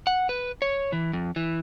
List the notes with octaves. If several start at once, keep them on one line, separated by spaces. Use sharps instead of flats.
F#5
B4
C#5
E3
F2
E3